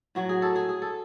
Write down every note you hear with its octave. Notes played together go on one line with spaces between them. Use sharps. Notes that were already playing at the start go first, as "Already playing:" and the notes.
A2 F#3 F#4
G#4
A4
G#4
G#4
A4